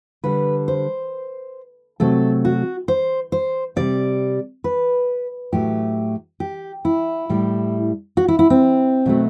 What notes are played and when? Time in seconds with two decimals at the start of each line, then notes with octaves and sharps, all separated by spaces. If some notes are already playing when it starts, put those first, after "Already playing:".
0.24 D3 G3 B4
0.68 C5
2.00 C3 F#3 A3 A4
2.45 F#4
2.88 C5
3.32 C5
3.76 C3 G3 D5
4.64 B4
5.52 A2 F#3 A3 G4
6.40 G4
6.85 E4
7.29 A2 G3
8.17 F#4
8.28 E4
8.39 E4
8.50 C4
9.06 B2 F#3 A3